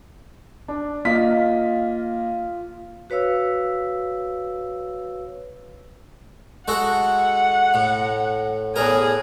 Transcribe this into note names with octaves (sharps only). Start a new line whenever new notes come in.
D4
A#3 F4 D#5 B6
F#4 B4 C#5 F5 E6
G#3 F#4 A4 F#5
A2
E2 A2 G#4 A#4